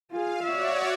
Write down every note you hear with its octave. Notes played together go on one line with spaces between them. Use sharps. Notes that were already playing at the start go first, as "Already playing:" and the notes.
F4 G#4 F5
F#4 C#5 D5 E5